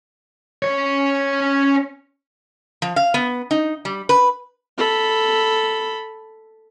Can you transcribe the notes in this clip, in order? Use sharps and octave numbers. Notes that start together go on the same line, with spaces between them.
C#4 C#5
F3
F5
B3
D#4
G3
B4
A4 B5